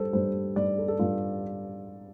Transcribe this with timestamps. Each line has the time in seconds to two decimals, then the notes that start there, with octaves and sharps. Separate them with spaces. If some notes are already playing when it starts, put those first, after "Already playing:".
Already playing: G2 G3 A4 C5
0.13 G2 G3 C5
0.56 G2 G3 D5
0.78 A4
0.88 A4
0.99 G2 G3 F4